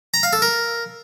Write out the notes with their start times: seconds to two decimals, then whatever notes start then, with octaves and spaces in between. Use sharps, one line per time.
0.14 A#5
0.23 F5
0.33 A4
0.42 A#4